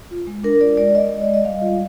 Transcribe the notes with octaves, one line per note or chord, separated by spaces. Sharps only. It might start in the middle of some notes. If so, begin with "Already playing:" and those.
F4
G#3
D4 A#4
F4 D5
G#3 D5
G#3 D#5
G#3
D5
G#3
D#5
G3 F5
F4